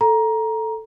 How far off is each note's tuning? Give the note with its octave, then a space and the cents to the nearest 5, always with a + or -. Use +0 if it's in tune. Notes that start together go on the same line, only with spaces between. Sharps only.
A4 +0 A#5 +15